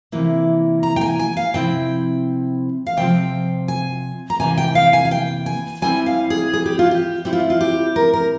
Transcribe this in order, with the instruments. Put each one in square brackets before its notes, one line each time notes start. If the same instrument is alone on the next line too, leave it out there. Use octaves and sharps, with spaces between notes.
[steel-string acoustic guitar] C3 E3 A#3 E4
A#5
G5
G#5
G#5
F5
C3 F3 C4 E4 G5
F5
C3 F3 C4 F4 G5
G#5
A#5
C3 E3 A#3 G#5
G5
F5
G#5
F5
G5
G#5
G3 C4 E4 G#5
F5
G#4
G#4
G4
F4
G4
G3 C4 E4 G4
F4
F4
G4
A#4
A#4